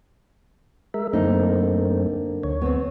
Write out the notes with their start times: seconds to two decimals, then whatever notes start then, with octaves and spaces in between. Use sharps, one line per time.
0.94 G#3 A#4 E5
1.13 F#2 D3 A3 A#3 C4 D#4
2.43 D2 C#5
2.62 B3 C4